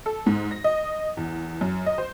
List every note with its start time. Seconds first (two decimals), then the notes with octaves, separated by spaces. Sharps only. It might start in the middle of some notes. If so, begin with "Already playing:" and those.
0.06 A4
0.26 G#2
0.51 A#6
0.64 D#5
1.17 E2
1.61 F#2
1.86 D#5
1.98 C5